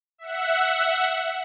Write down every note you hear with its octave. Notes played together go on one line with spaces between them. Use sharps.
E5 F#5